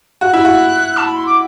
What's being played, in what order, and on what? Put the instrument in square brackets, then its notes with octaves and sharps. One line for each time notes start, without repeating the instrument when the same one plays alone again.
[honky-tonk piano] F#4 [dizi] F#6
[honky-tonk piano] E4
F#4
[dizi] A5
B5
C6
D6